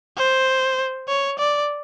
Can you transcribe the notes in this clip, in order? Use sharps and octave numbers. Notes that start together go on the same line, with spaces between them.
C5
C#5
D5